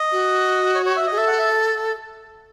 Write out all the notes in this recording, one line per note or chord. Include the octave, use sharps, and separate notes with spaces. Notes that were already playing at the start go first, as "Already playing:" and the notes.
Already playing: D#5
F#4
C#5
C#5
E5
G#4 D#5
A4 E5
F#5
E5